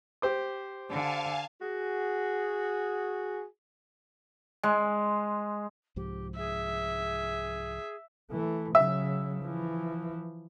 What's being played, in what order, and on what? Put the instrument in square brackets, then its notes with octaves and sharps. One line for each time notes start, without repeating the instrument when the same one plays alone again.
[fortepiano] G4 C5 D6
[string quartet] D3 [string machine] F5 G#5 A5
[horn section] F#4 G#4
[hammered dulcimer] G#3
[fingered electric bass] C2 G#2 F3 [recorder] G4
[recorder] G#4 [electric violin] E5
[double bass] E3 A3
[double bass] C#3 F#3 [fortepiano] E5
[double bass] E3 F3